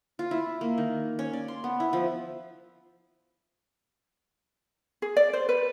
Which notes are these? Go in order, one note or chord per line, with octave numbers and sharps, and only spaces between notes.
F4
E4
A#3
D#3
C#4
D5
C6
B3
E4
F3
G#4
D5
C5
B4